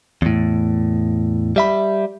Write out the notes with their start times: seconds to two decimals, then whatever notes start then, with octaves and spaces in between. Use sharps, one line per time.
0.22 E2 A2
1.56 G3 E5 B5